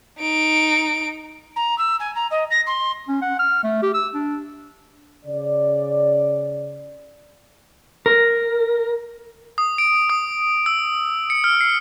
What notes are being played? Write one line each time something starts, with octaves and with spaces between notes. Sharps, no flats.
D#4 D7
A#5
E6
G#5
A#5
D#5
A#6
C6
C#4
F#5
F6
A3
G4
E6
D4
C#3 D5
A#4
D#6
D7
D#6
E6
C#7
F6
C7